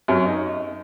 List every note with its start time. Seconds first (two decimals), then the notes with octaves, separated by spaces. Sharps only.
0.08 F#2 C#4
0.26 D#4